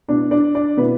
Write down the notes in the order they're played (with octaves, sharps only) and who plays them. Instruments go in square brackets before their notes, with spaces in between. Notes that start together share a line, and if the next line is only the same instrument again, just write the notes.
[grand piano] B2 B3 D4 E4 D5
D4 D5
D4 D5
B2 B3 E4 B4